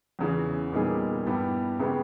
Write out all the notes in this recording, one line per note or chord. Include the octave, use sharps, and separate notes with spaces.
E2 C#3 E3
A#2 G3 B3 D#4 G#4
G2 G3 B3 E4 G4
C#3 G#3 B3 E4 G4